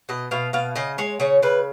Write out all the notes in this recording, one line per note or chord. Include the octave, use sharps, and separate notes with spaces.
B2 D#5
B2 F5
B2 F5
C#3 D#5
G#3 C#5
C#3 C#5
C#3 B4